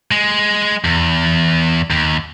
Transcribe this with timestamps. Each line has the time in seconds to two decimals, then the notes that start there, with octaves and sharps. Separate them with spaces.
0.11 G#3
0.85 E2
1.91 D#2